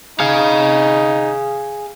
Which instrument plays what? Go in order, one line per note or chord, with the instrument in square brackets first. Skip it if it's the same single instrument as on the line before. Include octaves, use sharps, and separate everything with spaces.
[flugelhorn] D#4 [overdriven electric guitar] G#4 F5